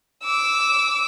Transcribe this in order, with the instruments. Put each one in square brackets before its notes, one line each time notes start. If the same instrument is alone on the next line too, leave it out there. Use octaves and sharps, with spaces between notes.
[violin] D6 E6